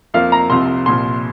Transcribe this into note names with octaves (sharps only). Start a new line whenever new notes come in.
F2 F3 A#3 F5
A#5
C2 C3 F3 C4 C6
C2 A#2 F3 C6